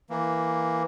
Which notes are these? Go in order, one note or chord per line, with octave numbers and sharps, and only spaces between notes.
E3 A#3